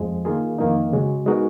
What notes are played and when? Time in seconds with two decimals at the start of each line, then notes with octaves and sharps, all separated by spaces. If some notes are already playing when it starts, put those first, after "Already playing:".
Already playing: F2 F3 G#3
0.25 D#3 A#3 F4 G#4
0.58 F2 D#3 A#3 D#4
0.93 C#3 G#3 C#4 F#4
1.26 G#3 B3 D#4 F#4 A#4